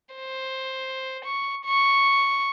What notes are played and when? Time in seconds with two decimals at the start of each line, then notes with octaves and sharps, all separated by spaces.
0.16 C5
1.26 C#6
1.66 C#6